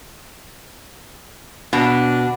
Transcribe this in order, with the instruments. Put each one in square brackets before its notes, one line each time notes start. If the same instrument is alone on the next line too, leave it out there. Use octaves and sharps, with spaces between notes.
[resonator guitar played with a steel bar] B2 [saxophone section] D4